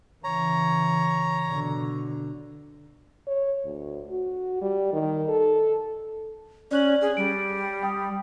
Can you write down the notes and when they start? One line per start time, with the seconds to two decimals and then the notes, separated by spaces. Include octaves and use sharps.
0.24 C#3 E3 C#5 A#5
1.49 B2 D3
3.27 C#5
3.65 D2
4.09 F#4
4.61 G3
4.93 D#3
5.29 A4
6.71 C#4 D5 F#6 F#7
7.02 G#4
7.17 G3 D7
7.83 G5 D#6